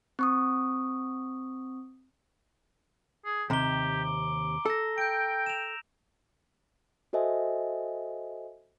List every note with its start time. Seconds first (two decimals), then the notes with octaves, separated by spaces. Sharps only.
0.19 C4 C#6 D#6
3.25 G#4
3.50 D#2 C3 G4 A#5 G7
4.04 D6
4.66 A4 E6 A#6
4.98 G5 G6 D7
5.46 E7 F7
7.13 F#4 A4 C5 D#5 E5 G#5